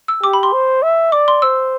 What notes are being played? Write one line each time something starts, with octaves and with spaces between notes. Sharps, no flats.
E6
G4 D6
B5
C6
C5
E5
D5 D6
C6
C5 E6